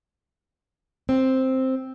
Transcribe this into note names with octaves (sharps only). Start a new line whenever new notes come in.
C4